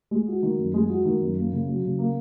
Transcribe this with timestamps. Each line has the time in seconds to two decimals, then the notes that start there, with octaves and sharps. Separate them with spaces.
0.11 G#3
0.28 F#4
0.43 D#3
0.59 F#2
0.74 G#3
0.89 F#4
1.05 D#3
1.21 F#2
1.37 A#3
1.53 C#3
1.68 F#3
1.83 C#3
1.99 A#3